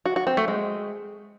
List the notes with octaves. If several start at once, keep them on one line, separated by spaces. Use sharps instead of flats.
F#4
F#4
C4
A3
G#3